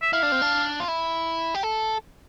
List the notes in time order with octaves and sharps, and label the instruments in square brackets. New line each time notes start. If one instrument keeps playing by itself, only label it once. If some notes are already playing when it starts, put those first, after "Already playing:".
[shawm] E5
[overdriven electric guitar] E4 [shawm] F5
[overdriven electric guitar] D4
C4
D4
F4
E4
G4
A4